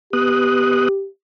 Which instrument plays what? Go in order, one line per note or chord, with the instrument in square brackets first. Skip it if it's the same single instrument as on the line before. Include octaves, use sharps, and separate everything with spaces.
[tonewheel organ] B3 D#6 F#6 [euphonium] G4